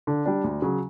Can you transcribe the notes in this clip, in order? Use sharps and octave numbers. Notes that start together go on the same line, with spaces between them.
D3
G3 D4
D2
C#3 F#3